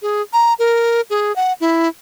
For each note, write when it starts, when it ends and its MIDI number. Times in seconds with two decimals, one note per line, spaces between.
0.02 0.22 68
0.33 0.54 82
0.59 1.01 70
1.10 1.35 68
1.36 1.53 78
1.61 1.88 64